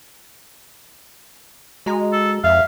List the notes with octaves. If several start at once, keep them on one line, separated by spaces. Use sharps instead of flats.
G#3 F#4 D#5 A#5
A4
F2 E5 F5